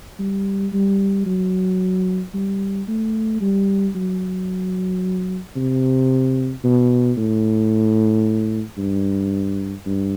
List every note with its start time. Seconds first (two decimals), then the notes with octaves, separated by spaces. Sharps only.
0.19 G3
0.73 G3
1.26 F#3
2.34 G3
2.88 A3
3.41 G3
3.95 F#3
5.57 C3
6.64 B2
7.17 A2
8.78 G2
9.86 G2